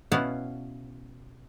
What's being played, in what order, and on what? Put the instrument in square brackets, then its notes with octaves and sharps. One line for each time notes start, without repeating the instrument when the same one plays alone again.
[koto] B2 B3 C#4 E4 F5 F#5